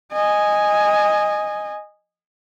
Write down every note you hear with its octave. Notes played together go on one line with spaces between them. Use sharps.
D#5 G#5